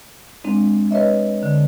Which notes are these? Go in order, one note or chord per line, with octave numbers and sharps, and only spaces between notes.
G#3 C4 D4
B4 C#5 D#5 E5
D3